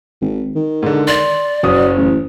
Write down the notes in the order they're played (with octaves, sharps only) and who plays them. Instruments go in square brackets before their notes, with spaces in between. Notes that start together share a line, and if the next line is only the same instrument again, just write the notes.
[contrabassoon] G#1
D#3
[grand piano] G#2 D3
[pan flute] D5 [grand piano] C6
[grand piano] F#1 C#4 D#6 [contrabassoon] F#3
[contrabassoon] A1